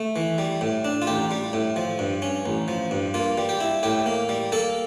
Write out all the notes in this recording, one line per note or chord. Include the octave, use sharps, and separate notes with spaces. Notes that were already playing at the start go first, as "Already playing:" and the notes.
Already playing: A3
E3
G3
A2
D4
F4
A1 G4
G3
A2
F3
G2
C#4
A1
F3
G2
A#3 F4
G3
G4
E4
A2 G4
A#3
G3
A#3 A4